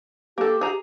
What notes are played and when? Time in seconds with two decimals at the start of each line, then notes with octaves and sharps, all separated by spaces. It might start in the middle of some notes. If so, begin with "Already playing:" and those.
0.38 A#3 G4 A4
0.61 G#4 A#5